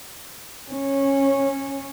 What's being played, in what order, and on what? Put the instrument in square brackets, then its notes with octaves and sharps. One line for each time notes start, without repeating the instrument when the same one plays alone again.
[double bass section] C#4